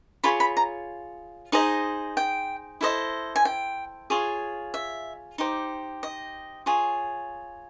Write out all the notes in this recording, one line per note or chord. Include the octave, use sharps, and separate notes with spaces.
F4 G#4 C#5 B5
B5
A#5
D#4 G#4 C5 D#5
G5
E4 A4 C5 D#5
G#5
G5
F4 G#4 C#5
E5
D#4 G4 C5
D#5
F4 G#4 C#5